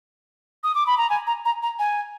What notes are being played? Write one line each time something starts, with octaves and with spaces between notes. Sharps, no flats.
D#6
D6
B5
A#5
G#5
A#5
A#5
A#5
G#5